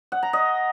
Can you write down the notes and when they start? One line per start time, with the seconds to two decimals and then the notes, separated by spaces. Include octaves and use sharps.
0.12 F#5
0.23 A#5
0.33 D#5